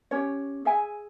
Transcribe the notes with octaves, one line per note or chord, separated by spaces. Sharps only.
C#4 G4 C#5
G#4 E5 G#5